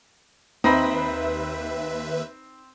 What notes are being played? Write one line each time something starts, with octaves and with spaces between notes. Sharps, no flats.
D#2 C4 D#4 B4 E5 B5